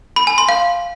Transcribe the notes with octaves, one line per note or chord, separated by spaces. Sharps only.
B5
G#5
C6
F5